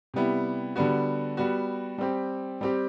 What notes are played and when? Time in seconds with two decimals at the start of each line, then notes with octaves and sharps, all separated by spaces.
0.14 C3 G3 B3 E4
0.76 D3 G3 B3 F#4
1.37 G3 B3 F#4
1.98 G3 C4 G4
2.61 G3 C4 G4